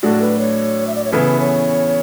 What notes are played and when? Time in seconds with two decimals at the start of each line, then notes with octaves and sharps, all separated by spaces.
0.03 A2 F#3 A3 D4 F#4 A4
0.21 B4
0.39 C#5
0.87 E5
0.95 D5
1.04 C#5
1.12 C#3 E3 B3 E4 A4 B4
1.40 C#5